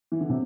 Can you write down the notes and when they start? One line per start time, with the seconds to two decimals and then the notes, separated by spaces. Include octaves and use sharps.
0.12 E3
0.21 D3
0.30 C3